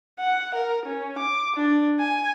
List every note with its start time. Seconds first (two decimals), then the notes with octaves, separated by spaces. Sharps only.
0.19 F#5
0.55 A#4
0.86 C#4
1.19 D6
1.56 D4
2.00 G#5